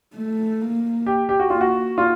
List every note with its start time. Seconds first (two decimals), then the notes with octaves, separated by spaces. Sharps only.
0.15 A3
0.61 A#3
1.06 G4
1.29 G4
1.40 F#4
1.50 A#3 F4
1.61 F#4
1.98 F4